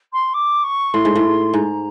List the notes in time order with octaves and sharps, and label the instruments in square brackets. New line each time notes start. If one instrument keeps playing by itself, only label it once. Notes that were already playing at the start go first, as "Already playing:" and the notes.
[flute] C6
D6
C#6
[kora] A2 [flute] C6
[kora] G#2
A2
[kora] G#2 [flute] A#5